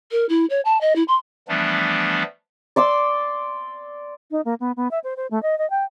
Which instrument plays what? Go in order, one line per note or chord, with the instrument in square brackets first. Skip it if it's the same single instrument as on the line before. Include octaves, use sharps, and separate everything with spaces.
[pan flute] A#4
E4
C#5
A5
D#5
E4
C6
[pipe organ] E3 F3 G3 A3 B3 D4
[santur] D5 C6 D6 E6
[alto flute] D#4
A#3
B3
B3
E5
C5
C5
A3
D#5
D#5
G5